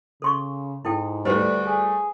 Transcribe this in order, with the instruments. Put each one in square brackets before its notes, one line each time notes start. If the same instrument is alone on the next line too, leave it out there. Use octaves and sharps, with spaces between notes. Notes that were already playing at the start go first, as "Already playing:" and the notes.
[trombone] C#3 [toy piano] A4 C6 C#6
[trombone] G#2 [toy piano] E4 A4 G5
[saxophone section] D2 F#4 D5 [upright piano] G3 A3 [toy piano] B4 C5
[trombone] G#4